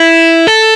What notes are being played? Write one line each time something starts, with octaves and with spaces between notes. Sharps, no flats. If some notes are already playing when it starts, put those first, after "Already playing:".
Already playing: E4
A4